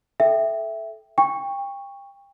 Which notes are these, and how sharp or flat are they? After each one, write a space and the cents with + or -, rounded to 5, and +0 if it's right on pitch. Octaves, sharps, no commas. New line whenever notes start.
A4 -20 E5 +0 G5 +0
G5 +30 C#6 +0